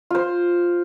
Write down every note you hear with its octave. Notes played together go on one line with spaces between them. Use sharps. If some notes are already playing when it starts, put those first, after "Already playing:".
F4 C5